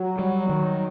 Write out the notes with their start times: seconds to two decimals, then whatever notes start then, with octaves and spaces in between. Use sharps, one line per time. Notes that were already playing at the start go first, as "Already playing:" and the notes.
Already playing: F#3
0.19 G3
0.49 D#3